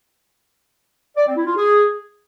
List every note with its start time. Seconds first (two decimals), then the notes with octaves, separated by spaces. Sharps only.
1.17 D5
1.27 C4
1.37 E4
1.46 F4
1.56 G#4